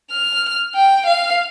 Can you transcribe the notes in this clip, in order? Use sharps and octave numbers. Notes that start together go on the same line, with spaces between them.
F6
G5
F5